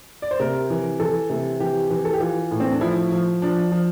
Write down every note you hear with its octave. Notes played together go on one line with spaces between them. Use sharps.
D5
C5
C3 A#4
E3
E3 A4
C3
E3 G4
E3
A4
G4
E3 F4
A2
C4
D4
F3 E4
F3
F3 D4
F3